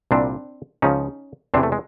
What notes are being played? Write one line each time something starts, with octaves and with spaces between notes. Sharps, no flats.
C2 A#2 G3 C4 D4
C#2 C#3 F3 C#4 D#4
E2 C3 E3 C4 D4
A3
G#3